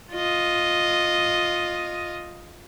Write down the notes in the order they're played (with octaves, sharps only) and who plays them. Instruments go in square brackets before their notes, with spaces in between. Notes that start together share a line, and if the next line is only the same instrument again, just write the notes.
[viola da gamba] F4 D#5